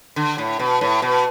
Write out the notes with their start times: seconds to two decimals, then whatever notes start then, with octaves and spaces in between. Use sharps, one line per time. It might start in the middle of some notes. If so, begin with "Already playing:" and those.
0.16 D3
0.38 A2
0.59 B2
0.81 A2
1.02 B2